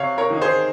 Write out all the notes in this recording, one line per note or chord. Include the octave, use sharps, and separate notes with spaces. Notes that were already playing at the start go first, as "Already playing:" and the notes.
Already playing: C3 C#5 F5
A#4 C#5
D#3 A#3 D#4
G#4 C5